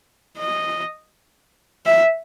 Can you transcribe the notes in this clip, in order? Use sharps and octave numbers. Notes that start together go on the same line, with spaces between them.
D#5
E5